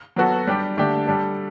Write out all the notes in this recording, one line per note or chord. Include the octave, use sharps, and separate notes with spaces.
F#3 B3 F#4 A4
G3 D4 G4
D3 A3 D4 G4
G3 D4 A4